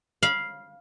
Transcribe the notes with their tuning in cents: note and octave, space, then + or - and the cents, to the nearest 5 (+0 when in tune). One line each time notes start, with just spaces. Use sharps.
F5 +0 B5 -25